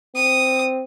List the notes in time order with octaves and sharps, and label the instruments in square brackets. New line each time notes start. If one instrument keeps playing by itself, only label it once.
[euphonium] C4 [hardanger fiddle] D#6